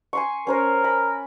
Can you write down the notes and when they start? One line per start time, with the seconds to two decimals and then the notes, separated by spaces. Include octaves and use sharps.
0.13 G#5 C6 C#6
0.47 C#4 A#4 C5 C#5
0.84 B5